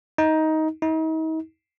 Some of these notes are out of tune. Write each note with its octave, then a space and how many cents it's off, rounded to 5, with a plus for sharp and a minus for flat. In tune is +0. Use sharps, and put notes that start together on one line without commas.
D#4 +15
D#4 +40